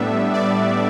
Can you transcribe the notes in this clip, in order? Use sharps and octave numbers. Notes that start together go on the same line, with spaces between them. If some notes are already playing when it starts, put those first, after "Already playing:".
Already playing: A2 G3 B3 D4 E5
D5